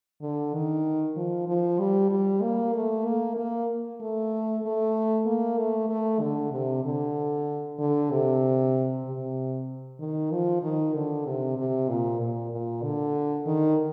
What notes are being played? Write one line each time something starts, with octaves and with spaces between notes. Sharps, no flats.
D3
D#3
F3
F3
G3
G3
A#3
A3
A#3
A#3
A3
A3
A#3
A3
A3
D3
C3
D3
D3
C3
C3
D#3
F3
D#3
D3
C3
C3
A#2
A#2
A#2
D3
D#3